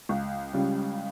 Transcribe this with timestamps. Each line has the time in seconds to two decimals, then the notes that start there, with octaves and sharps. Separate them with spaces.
0.09 C#2
0.52 C#3 G3 C#4 F4